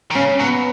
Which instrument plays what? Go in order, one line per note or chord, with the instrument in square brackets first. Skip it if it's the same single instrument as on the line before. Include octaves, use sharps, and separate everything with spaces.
[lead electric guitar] D#3
[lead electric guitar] C#3 [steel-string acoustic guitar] C#4
[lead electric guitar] F#3 [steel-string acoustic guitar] B3